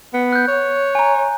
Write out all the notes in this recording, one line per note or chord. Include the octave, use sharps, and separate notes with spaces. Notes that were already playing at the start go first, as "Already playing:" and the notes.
B3
F#6 G6
C#5
G#5 A#5